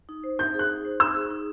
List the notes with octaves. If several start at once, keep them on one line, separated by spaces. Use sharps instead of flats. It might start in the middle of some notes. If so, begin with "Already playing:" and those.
D#4
C5
D#4 G6
G#4
F#6
D#4
C5
D#4 E6
G#4
D#4